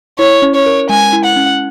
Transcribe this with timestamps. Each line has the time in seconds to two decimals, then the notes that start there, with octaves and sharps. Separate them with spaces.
0.19 E4 C#5
0.42 C#4
0.55 C#5
0.66 A#4
0.89 G#3 G#5
1.13 E4
1.25 F#5
1.36 C#4